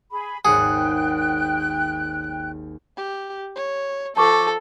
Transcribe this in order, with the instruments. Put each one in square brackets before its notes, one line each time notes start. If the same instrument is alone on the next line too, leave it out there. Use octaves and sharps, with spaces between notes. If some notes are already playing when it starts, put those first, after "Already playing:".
[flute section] G#4 B5
[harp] G#1 D#2 F#5 [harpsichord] G#4 [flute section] G5 F#6
[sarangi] G4
C#5
[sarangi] F3 [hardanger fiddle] A4 [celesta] A5 C#6 D6